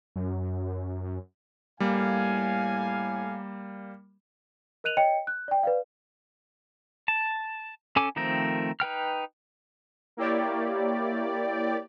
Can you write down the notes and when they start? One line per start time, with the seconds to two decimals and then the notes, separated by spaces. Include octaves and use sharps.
0.16 F#2
1.80 A2 G3 A#3 F5 G#5
4.84 A#4 D#5 F#6 D#7 F7 F#7
4.97 C#5 D#5 G5 C#7
5.27 F#6
5.48 D5 G5
5.63 B4 D5 F5
7.08 A5
7.96 C#4 A4 G#5 D6
8.16 D#3 F3 A3 C4 A#4
8.80 D#4 B4 G5 F6
10.17 A#3 E4 G4 C#5 D5